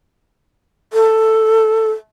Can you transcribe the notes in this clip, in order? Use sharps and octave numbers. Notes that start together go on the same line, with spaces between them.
A4